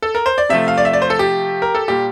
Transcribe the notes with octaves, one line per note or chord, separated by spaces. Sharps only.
A4
A#4
C5
D5
C3 F3 A3 E5
F5
D5
E5
D5
C5
A4
G4
A#4
A4
A#2 G3 G4